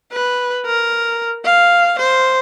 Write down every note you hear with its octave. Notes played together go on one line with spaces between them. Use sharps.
B4
A#4
F5
C5